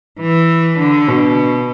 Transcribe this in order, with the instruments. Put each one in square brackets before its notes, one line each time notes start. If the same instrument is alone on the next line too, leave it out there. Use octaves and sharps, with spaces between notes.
[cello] E3
D3
B2